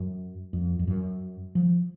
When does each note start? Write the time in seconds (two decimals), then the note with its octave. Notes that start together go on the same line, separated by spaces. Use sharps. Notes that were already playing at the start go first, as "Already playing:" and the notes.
Already playing: F#2
0.53 F2
0.79 F2
0.87 F#2
1.55 F3